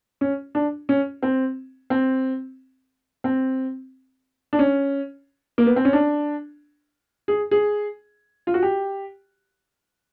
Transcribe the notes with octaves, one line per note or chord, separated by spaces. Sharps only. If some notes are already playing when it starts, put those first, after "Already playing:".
C#4
D4
C#4
C4
C4
C4
D4
C#4
A#3
B3
C4
C#4
D4
G#4
G#4
F4
F#4
G4